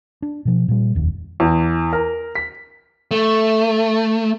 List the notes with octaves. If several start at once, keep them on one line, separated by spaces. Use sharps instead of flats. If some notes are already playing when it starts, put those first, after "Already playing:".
D4
B2 F3
A#2 G3
F1 D#2
E2
A#4
B6
A3